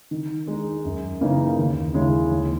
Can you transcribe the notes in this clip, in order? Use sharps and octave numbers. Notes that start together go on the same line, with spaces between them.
D#3
G#3 D#4
F#2
C#3 E3 A#3 D#4
D#2
C#3 G#3 C#4 E4
D#2